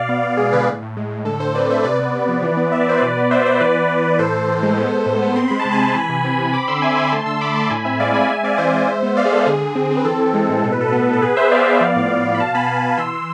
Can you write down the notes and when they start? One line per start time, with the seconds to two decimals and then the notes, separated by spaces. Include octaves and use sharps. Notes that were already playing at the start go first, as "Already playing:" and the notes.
Already playing: B2 D5 F5
0.09 B3
0.23 B3
0.37 G#3 G#4
0.52 D3 G#4 B4
0.68 A2
0.82 A2
0.97 G#3
1.10 A2
1.25 D3 A4
1.40 D3 A4 C5
1.55 C4 B4 D5
1.69 D3 C5 E5
1.84 C3 B4 D5
1.98 B3 B4 D5
2.14 B3
2.28 F3
2.42 E3
2.57 B3
2.72 E3 E5
2.80 D5
2.86 E3 C5
2.97 B2 B4 D5
3.17 B3
3.31 B3 C5 E5
3.46 B3 C5 E5
3.60 E3 B4 D5
3.75 E3
3.89 E3
4.04 E3
4.19 A2 A4 C5
4.33 A2
4.48 A2
4.63 G#3
4.77 B3
4.92 G#3
5.06 A2
5.22 B3
5.36 C4 C6
5.48 G#3 B5
5.60 A5
5.65 C3
5.71 G#5 B5
5.80 C3
5.95 E3
6.09 C3
6.25 C4
6.38 C3
6.53 C4 B5 D6
6.68 D3 C6 E6
6.82 D3 E5 G#5
6.97 D3 G#5 B5
7.11 A3 A5 C6
7.26 D3 C6 E6
7.41 D3 B5 D6
7.56 D3 A5 C6
7.71 A2 G#5 B5
7.85 C4 E5 G#5
7.99 G#3 D5 F5
8.14 G#3 G#5 B5
8.29 G#3 E5 G#5
8.43 C4 D5 F5
8.55 D5
8.58 E3 C5 E5
8.73 G#3
8.87 G#3
9.03 B3
9.17 B3 D5 F5
9.25 G#4
9.32 G#3 A4
9.46 D3 G#4
9.62 D3
9.75 C4
9.91 C4
9.97 B4
10.05 E3 A4
10.19 E3
10.34 G#3
10.49 A2
10.64 B2 A4
10.72 B4
10.78 B2 A4
10.88 B4
10.93 B3 A4
11.05 B4
11.08 B3 A4
11.22 B3 G#4 B4
11.37 B3 C5 E5
11.52 B3 D5 F5
11.66 B3
11.81 F3
11.96 A2
12.10 A2
12.25 A2
12.35 B5
12.40 B2 F5 A5
12.55 B3 G#5 B5
12.68 B2
12.84 B2
12.98 E3 C6 E6
13.13 E3